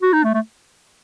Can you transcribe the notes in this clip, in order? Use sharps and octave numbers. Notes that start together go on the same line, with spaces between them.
F#4
D#4
A3
A3